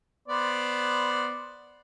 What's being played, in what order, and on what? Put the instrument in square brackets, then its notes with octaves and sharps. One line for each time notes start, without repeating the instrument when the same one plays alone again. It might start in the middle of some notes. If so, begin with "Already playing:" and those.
[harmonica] B3 C5 D5